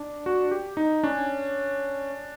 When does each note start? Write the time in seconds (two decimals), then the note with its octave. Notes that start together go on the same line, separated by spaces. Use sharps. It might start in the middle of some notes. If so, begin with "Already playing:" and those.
Already playing: D4
0.26 F#4
0.51 G4
0.77 D#4
1.03 C#4 D4